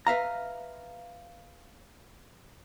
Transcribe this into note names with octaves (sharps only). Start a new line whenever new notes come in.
B4 E5 F5 A#5